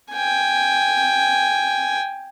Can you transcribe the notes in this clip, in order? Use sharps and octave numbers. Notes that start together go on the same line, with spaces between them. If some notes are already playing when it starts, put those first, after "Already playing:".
G5 G#5